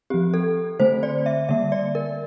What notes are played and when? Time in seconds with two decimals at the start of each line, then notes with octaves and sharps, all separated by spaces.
0.10 F3 C4 G4
0.34 A4
0.80 D3 A3 C4 C5
1.03 D5
1.26 E5
1.49 D3 G3 A#3 E5
1.72 D5
1.95 A#4